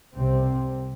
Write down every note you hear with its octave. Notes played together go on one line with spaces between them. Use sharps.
C2 C3 C4